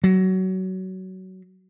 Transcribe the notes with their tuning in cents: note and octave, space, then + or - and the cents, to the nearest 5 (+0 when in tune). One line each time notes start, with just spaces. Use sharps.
F#3 +20